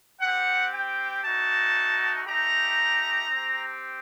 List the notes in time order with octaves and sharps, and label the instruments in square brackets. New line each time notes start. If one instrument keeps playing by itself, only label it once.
[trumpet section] C4 G4 F#5
G5
A3 D#4 F#4 A5
A3 D#4 G4 A#5
C4 G4